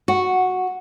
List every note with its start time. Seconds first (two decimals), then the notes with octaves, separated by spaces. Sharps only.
0.08 F#4